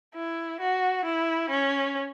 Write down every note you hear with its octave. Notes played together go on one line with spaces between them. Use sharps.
E4
F#4
E4
C#4